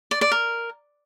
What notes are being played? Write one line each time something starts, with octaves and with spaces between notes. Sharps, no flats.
D5
D5
A#4